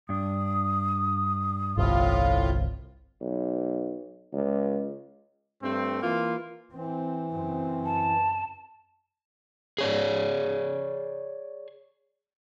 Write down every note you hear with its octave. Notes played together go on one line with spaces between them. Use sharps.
G2 D4 D#6
G1 C2 A2 F4
B1
C#2
G2 A3 C4
E3 A#3 F4
E3 C4
F#2 C#3 C4
A5
G#4 C#5 D5